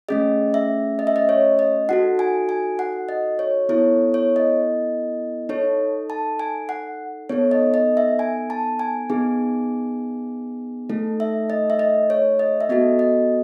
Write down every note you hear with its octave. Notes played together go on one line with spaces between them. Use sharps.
A3 C#4 G#4 D#5
E5
D#5
E5
D#5
C#5
D#5
D#4 F#4 A4 F#5
G#5
G#5
F#5
D#5
C#5
B3 E4 A4 C#5
C#5
D#5
D#4 A4 C#5
A5
G#5
F#5
B3 D#4 A4 C#5
D#5
D#5
E5
G#5
A5
G#5
B3 D#4 G#4
A3 D#4 A4
E5
D#5
E5
D#5
C#5
D#5
E5
B3 F#4 A4 D#5
D#5